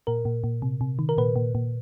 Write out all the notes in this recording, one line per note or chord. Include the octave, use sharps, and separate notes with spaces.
A#2 A#4
A#2
A#2
C3
C3
D#3
A#4
A#2 B4
A#2
A#2